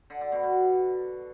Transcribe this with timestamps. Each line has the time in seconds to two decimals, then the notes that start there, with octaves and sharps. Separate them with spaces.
0.10 D3
0.21 D3
0.32 B2
0.43 B2